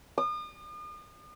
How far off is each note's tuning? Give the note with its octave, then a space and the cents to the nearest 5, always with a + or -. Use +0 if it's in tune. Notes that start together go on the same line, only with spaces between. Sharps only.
D#6 -40